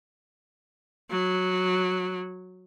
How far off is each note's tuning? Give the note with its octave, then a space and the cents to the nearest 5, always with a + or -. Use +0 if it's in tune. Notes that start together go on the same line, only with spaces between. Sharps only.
F#3 -10